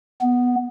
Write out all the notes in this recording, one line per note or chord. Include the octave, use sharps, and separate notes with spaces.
B3